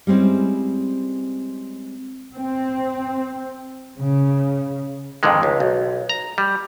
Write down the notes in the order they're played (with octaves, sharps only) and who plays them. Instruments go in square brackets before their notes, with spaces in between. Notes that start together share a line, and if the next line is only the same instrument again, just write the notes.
[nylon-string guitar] G3 G#3 C4 C#4 E4
[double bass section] C4
C#3
[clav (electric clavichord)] F2 G#2 D3 D#3 G#3
C#2
B1
A#5
G3